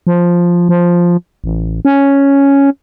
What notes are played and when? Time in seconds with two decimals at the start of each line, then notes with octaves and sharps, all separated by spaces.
0.07 F3
0.69 F3
1.44 A1
1.85 C#4